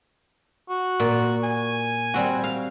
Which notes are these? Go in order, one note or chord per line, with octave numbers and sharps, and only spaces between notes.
F#4
A#2
G#5
G3 C4 F#4
F5